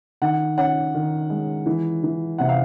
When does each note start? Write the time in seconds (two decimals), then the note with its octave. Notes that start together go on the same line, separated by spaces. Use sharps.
0.22 D#3 F#5
0.58 C#4 F#5
0.94 D#3
1.30 G#3
1.66 E3
2.03 E3
2.38 C3 F#5
2.49 F5